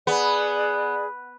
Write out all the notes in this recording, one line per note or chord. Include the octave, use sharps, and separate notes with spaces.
B3 G#4 D5